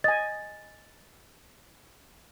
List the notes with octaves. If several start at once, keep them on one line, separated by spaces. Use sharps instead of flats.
D#5 G#5 A6